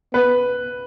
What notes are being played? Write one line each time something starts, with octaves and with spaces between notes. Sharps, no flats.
B3 B4